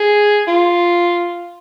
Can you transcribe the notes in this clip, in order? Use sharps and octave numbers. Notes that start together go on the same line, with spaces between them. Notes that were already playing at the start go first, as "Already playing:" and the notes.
Already playing: G#4
F4